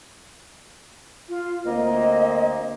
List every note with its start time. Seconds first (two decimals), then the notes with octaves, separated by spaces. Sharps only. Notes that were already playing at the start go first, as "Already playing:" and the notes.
1.29 F4
1.65 D2 A#3 C4 D#5